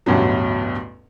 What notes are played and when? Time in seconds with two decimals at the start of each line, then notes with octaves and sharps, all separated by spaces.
0.06 A1 D2 G2 B2 F#3